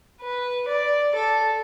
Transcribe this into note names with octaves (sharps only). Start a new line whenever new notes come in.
B4
D5
A4